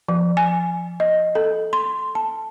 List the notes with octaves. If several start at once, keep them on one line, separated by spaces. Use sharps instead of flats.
F3
G#5
D#5
A4
C6
A5